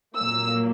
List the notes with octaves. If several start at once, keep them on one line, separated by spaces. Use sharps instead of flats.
A#2 F#3 A#3 E6